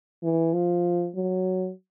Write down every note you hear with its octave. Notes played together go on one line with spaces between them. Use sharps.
E3
F3
F#3